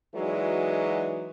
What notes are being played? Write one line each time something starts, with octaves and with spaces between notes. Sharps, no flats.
E3 F#3 G#3 D#4 F#4 D5